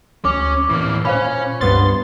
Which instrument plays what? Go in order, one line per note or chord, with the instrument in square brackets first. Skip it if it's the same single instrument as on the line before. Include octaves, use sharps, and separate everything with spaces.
[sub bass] D2 [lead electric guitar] C#4 [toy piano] D6
[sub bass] A2 [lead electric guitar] E3 A#3
[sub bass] A#2 [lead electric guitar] C#4 [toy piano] C5 F5 B5
[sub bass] C#2 [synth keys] G2 B3 A6 [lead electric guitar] C6